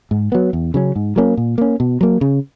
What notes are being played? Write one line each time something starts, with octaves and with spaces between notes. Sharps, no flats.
G#2
F#3 B3
E2
C#3 F#3 C#4
G#2
F#3 A#3 C#4
A#2
A#3 C#4
B2
F#3 A#3
C#3